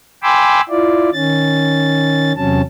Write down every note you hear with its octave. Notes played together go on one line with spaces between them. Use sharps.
G5 G#5 B5 C6 D6 E6
E4 F4 D5
D#3 C#4 A6
E2 C3 F#3 C#4 A5